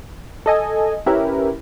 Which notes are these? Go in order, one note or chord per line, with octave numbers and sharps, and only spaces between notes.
A4 D#5 G#5
C#4 E4 G4 A#4 B4